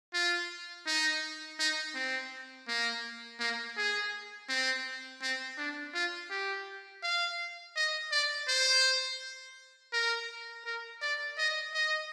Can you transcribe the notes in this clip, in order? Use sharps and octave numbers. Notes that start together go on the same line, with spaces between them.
F4
D#4
D#4
C4
A#3
A#3
G#4
C4
C4
D4
F4
G4
F5
D#5
D5
C5
A#4
A#4
D5
D#5
D#5